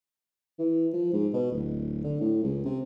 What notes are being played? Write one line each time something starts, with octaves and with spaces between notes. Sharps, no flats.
E3
F3
G#2
B2
D1
D3
A2
C#2
C3